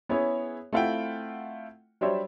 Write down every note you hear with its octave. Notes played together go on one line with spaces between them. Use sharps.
B3 C#4 E4 G#4 C#5
A3 C4 E4 F4 F#5 G5
F#3 G3 D4 C5 C#5 E5